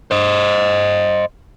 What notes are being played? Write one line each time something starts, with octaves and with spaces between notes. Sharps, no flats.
C5 D#5